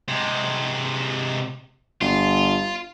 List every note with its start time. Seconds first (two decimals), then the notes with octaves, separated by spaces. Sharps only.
0.08 C3 G#3
2.01 G1 F4